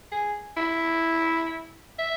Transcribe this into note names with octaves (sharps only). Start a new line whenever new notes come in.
G#4
E4
E5